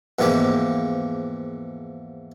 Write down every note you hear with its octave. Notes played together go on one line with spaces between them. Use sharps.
E2 G#2 F3 A#3 G4